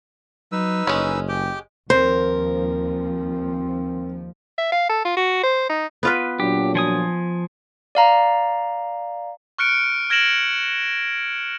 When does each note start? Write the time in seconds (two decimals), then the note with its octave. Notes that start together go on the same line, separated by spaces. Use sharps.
0.52 F#3 D#4 B4 E6
0.87 F#1 G#3 C#4
1.29 G4 G5
1.90 D#2 F3 C4 A#4 C5
4.58 E5
4.72 F5
4.89 A4
5.05 F4
5.17 F#4
5.43 C5
5.69 D#4
6.03 B3 F4 B4
6.40 A#2 F#3 D4 G4
6.75 F3 G#5 D#6
7.95 D5 F5 A#5
9.58 C#6 F6 F#6 C#7 D7
10.10 F6 G#6 A#6 D7 E7 F#7